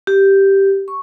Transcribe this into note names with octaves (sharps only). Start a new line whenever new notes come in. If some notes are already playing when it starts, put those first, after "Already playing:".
G4
C#6